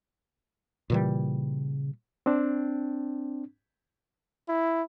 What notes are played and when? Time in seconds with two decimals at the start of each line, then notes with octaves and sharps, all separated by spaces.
0.90 A#2 C#3 E3 G3
2.26 C4 D4
4.49 E4